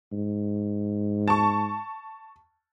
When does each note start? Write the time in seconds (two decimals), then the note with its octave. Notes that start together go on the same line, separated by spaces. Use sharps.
0.13 G#2
1.28 A5 C#6